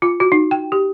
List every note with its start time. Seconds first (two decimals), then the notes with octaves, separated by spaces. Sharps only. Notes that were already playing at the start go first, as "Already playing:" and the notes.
0.02 F4
0.20 F#4
0.32 D#4
0.51 G5
0.72 G4